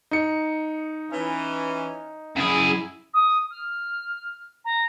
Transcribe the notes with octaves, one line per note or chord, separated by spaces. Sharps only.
D#4 C#7
E3 C#4
F#2 E4 G#4
D#6
F6
A#5